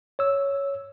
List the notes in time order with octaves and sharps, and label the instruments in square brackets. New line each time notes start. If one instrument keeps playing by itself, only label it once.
[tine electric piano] C#5 E6